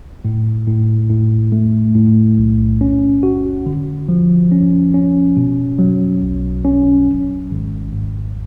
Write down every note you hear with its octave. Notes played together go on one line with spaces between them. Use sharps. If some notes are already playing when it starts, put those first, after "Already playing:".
A2
A2
A2
A3
A2
B1
C#4
F#4
D3
F3
C#4
C#4
B2
F#3
B1
C#4
G#1
G#1
G#2